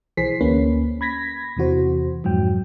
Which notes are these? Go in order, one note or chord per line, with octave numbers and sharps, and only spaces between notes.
B1 E3 G#4 C5 B6 C7
D2 A#3 C#4 B4
B5 G#6 A#6 B6
E2 C3 E3 F#4 C5
F2 G#2 F#3 G5